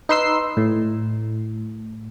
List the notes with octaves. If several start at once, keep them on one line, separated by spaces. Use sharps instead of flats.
D#4 B4 C6 E6 C7
A2